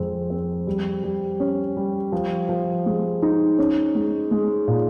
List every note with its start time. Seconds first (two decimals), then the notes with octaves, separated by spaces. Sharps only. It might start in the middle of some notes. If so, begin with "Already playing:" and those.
Already playing: F2 G#3 C4
0.30 C4
0.67 G3
1.04 G3
1.40 C#4
1.77 G3
2.12 F3
2.49 F3
2.86 G#3
3.22 D#4
3.58 C#4
3.95 G#3
4.31 G#3
4.68 A#2